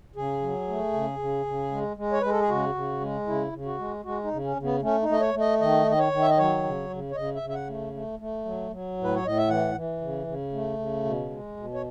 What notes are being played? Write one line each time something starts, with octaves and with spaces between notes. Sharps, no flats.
C#3 G#4
F#3
A3
C#3
C#3
C#3
G#3
G#3
C#5
G#3 B4
A4
G#4
C#3 F#4
C#3
G#3
C#3 E4
C#3
F#4
G#3
G#3 F#4
D#4
C#3
C#4
C#3
B3
A3 C#4
D#4
A3 D#5
C#5
A3
D#5
D#3 D#5
D#3 D#5
C#5
D#3
E5
D#5
F#3 C#5
C#3
C#3
C#5
C#3 D#5
E5
C#3
E5
F#5
A3
A3
A3
F#3
F#3
A2
B4
C#5
A2 D#5
E5
E3 F#5
E3
C#3
C#3
A3
C#3
B2
G#3
B2
C#5